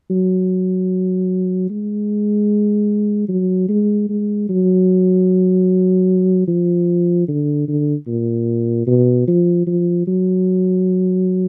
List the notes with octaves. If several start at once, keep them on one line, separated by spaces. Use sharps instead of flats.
F#3
G#3
F#3
G#3
G#3
F#3
F3
D3
D3
A#2
B2
F3
F3
F#3